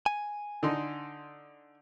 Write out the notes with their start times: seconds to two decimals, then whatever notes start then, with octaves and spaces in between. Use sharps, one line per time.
0.06 G#5
0.63 D3 D#4 C6